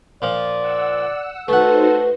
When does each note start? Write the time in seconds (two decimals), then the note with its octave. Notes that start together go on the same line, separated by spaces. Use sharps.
0.22 A#2 F3 D5
0.59 F#5 E6
1.48 A3 D#4 F#4 A4 B4 C5 F#5